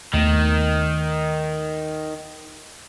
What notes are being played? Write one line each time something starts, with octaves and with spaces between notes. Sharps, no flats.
D#2 D#3 A3 B3